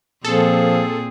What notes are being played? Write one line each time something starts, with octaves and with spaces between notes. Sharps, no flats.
A#2 F3 C4 G#4 A4